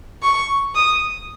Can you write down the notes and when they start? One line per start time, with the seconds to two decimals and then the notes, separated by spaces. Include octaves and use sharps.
0.22 C#6
0.75 D#6